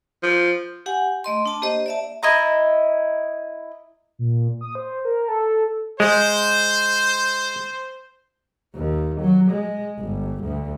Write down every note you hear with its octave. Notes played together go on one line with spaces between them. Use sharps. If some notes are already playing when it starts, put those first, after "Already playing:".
F3
G4 F#5 G#5
A3 D#5 C6
D4 A5
A#3 G4 C5 D#5
D5 E5 A5
E4 D#5 A#5
A#2
D#6
C5
A#4
A4
G#3 C5
D#2
F#3
G#3
G1
D2